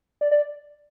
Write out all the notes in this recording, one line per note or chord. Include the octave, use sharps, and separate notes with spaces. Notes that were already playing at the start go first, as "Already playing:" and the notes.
D5
D5